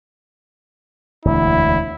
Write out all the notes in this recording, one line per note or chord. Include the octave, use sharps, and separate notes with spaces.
E1 D2 E4